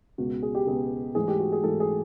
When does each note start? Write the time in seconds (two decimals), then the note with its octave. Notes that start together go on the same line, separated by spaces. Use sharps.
0.18 C#2 B2 G#3 B3 F#4
0.43 G#4
0.55 G4
0.66 C#2 B2 G#3 B3 G#4
1.15 G#2 E3 A3 G#4
1.28 G4
1.39 F#4
1.52 G#4
1.64 G#2 E3 A3 A4
1.80 G#4